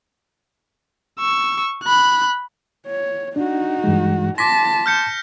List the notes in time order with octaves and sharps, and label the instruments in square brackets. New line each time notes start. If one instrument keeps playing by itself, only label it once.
[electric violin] C#6 E6
B5 F#6
[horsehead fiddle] C#5
[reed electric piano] D4 [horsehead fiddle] D#4 F#4
[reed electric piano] G2 E3 G#3
[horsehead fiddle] A5 [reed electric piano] C6 D6 [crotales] A#6 B6
[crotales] F6 G6 C#7